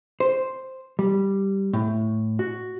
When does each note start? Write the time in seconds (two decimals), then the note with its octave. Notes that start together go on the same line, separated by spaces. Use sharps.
0.20 C5
0.99 G3
1.73 A2
2.39 F#4